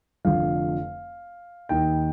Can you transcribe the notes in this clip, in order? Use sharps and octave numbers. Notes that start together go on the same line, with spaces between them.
F1 F2 D3 F3 F5
D#2 D#3 G5